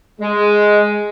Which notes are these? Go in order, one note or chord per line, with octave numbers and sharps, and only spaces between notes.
G#3